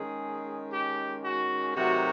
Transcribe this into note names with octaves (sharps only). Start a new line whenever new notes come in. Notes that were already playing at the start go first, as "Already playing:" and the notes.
Already playing: D#3 G#3 C#4 G#4
G4
F#4
C3 D#3 F#3 A3 F#4